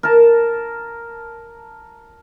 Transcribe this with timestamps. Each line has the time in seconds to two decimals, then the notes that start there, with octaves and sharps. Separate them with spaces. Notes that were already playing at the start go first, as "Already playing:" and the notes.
0.03 A#4 A5